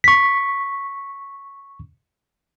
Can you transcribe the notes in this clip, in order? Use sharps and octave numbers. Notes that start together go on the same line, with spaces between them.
C#6 B6